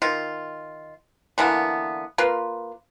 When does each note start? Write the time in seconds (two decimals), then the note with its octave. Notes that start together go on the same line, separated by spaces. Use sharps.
0.02 D#3 F4
1.38 D3 E3 A#3 B3
2.18 A#3 F4 B4 C6